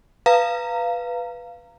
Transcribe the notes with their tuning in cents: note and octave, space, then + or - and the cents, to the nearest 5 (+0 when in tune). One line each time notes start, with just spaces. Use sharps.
B4 +0 F5 -10 A#5 -15